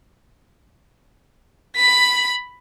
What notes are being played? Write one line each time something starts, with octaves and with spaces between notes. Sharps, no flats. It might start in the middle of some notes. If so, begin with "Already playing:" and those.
B5 B6